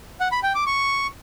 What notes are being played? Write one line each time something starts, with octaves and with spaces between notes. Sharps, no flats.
F#5
B5
G5
D6
C#6